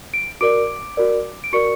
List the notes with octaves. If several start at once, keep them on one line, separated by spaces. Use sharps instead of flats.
D7
F#4 A#4 D5 D6 D7
F#4 A#4 D5
D7
F#4 A#4 D5 C#6 C#7